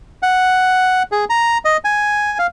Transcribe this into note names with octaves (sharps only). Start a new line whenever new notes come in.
F#5
G#4
A#5
D#5
G#5
F5